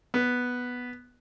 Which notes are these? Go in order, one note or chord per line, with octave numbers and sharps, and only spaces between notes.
B3